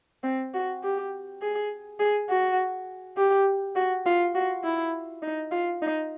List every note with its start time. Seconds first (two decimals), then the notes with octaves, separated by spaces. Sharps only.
0.23 C4
0.54 F#4
0.83 G4
1.42 G#4
1.99 G#4
2.29 F#4
3.17 G4
3.75 F#4
4.06 F4
4.35 F#4
4.64 E4
5.22 D#4
5.51 F4
5.82 D#4